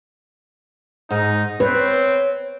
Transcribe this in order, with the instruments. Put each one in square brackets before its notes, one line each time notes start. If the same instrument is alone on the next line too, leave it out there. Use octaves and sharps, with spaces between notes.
[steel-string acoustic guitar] G#2 [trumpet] D#4
[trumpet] C4 [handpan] B4 [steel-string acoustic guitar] C#5